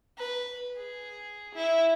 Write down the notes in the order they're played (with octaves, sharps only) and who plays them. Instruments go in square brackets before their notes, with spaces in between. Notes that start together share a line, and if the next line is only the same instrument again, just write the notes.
[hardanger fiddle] B4
G#4
E4